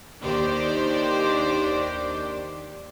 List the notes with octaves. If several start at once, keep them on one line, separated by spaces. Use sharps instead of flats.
D#2 D#3 D4 G4 C5 D5